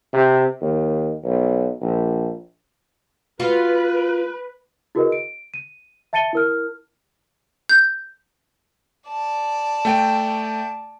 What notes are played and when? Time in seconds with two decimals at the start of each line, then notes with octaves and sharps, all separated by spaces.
0.13 C3
0.61 D#2
1.24 B1
1.81 A#1
3.40 F4 F#4 B4
4.95 E4 F#4 G#4 A#4 B4 D#5
5.12 D7
5.54 D#7
6.13 E5 A5 A6 C#7 D#7 G7
6.33 E4 A#4 F6
7.69 G6
9.10 D5 A5
9.85 A3 G5 D7